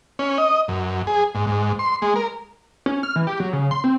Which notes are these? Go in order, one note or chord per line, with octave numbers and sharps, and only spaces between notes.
C#4
D#5
F#2
G#4
G#2
G#2
C6
G#3
A#4
C#4
F6
E3
G4
F#3
C#3
C6
C4